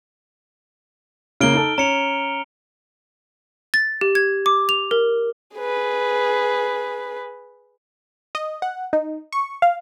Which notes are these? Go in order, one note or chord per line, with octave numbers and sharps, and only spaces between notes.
C#3 A#3 F6 D7 G7
D#4 A4
C#4 A#5 C#7 F7
A6
G4
G#6
D6
F7
A#4
G#4 B4
D#5
F#5
D#4
C#6
F5